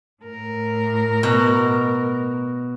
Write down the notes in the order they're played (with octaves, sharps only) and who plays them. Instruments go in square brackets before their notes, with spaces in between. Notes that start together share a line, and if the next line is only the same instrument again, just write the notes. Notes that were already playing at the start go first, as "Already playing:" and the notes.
[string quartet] A2 A#4
[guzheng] B2